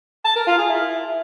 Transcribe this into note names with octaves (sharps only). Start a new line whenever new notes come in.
A5
A#4
F4
G#4
E4